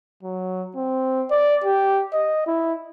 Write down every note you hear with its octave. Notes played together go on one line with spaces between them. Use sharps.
F#3
C4
D5
G4
D#5
E4